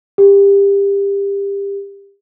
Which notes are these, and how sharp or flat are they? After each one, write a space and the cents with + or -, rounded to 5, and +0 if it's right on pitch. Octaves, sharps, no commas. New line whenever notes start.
G4 +25